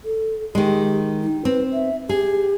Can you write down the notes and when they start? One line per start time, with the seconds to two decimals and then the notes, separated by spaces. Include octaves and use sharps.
0.05 A4
0.55 D#3 G#3 G4
1.22 D#4
1.45 C4 B4
1.73 E5
2.09 G4 G#4